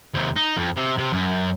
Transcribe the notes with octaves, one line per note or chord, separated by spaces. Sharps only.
D#2 C3
D#4
F2
C3
C3
F#2